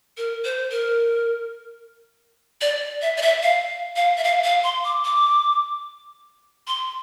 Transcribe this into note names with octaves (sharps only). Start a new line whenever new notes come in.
A#4
C5
A#4
D5
E5
D5
E5
F5
F5
E5
F5
F5
C6
D6
D6
C6